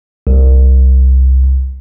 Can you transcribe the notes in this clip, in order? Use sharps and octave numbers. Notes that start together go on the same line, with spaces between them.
C2